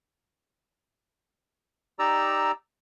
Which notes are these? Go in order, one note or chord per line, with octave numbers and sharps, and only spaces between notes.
D#4 G4 D5 A#5 E6